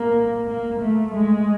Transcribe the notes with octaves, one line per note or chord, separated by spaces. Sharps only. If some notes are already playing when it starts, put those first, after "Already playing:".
Already playing: A#3
A#3
A3
G#3